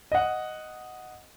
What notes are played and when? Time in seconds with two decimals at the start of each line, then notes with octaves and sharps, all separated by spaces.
0.12 D#5 F#5